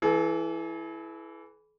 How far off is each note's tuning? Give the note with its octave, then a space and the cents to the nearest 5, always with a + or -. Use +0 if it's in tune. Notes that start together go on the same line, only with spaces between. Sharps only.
E3 +0 A4 -45